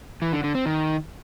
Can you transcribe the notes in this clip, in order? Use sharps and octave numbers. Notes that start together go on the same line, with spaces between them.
E3
D3
D3
C4
D#3